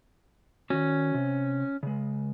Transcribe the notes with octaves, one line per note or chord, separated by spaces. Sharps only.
D#3 C#4 F#4
C3
C#3 G#3